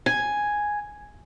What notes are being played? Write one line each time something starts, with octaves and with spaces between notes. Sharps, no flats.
G#5